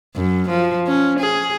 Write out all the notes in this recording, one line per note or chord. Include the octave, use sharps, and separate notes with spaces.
F#2
F3
C#4
G#4